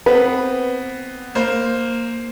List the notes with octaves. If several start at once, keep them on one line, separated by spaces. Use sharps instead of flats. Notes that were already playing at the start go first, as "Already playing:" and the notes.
B3 C4 B4
A#3 C5